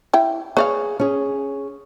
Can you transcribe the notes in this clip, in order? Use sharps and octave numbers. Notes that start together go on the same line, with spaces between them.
E4 G5
G#4 B4 C#5 D5 F5
C#4 G#4